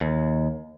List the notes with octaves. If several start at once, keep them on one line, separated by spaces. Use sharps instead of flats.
D#2